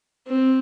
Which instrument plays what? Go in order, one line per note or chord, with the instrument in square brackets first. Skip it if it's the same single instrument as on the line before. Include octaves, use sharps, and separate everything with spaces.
[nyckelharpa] C4